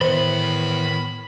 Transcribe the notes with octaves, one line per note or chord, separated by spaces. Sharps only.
A2 D#3 E3 B3 C5 B5